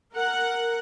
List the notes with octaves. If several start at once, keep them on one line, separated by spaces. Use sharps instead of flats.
A#4 F#5